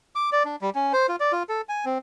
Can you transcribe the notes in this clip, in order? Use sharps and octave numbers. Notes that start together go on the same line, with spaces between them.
D6
D5
D4
G3
C#4
C5
F4
D5
F4
A4
G#5
C4